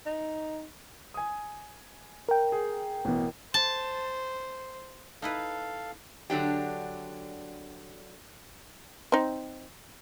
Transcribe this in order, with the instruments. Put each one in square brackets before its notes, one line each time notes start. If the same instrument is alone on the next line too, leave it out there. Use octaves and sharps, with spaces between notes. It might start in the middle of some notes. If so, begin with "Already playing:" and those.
[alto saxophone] D#4
[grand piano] G#5 D#6
[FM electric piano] A#4 G5
[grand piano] G#4
A1 B2
[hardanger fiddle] C5 [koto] A5
[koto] D#4 E4 B4 [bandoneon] A4 F5
[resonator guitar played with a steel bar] D3 F#3 D4 G4
[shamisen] C4 D#4